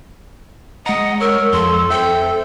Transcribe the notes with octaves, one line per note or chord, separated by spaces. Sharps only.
G#3 D#5 F#5 A#5
A#4 C#5 E6
F2 A4 C6
C4 A4 E5 G5